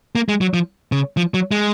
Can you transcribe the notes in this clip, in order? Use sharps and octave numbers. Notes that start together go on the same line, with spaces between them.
A#3
G#3
F#3
F3
C#3
F3
F#3
G#3